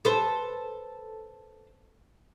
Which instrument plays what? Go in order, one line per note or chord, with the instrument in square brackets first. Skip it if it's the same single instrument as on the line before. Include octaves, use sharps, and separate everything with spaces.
[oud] A4 B4 C5